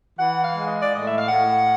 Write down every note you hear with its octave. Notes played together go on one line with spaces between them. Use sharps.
E3 F#5
F5
G#3
D#5
D5
A2 D#5
E5
F5
A2 F#5